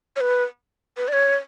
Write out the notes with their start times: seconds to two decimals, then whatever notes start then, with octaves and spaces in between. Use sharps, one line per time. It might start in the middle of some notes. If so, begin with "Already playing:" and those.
0.16 C#5
0.21 B4
0.97 B4
1.08 D5
1.13 C#5